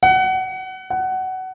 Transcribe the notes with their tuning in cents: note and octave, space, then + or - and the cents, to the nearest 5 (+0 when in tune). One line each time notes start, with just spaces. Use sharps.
F#5 +25
F#5 +20